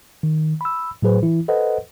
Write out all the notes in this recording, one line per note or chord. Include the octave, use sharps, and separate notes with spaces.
D#3
B5 E6
A2 F#3 G#4 B4 C5
E3 E4
A4 B4 C5 D#5 F#5